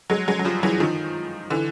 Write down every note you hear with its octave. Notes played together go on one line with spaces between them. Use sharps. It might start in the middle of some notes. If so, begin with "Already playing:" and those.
F#3 G#3
F#3 G#3
F#3
F3 G3
E3 F#3
D#3 F3
D3 E3